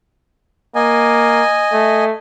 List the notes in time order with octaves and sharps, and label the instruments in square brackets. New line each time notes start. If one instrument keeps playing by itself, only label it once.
[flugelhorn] A#3 [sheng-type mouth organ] D#5 G#5
[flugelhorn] A3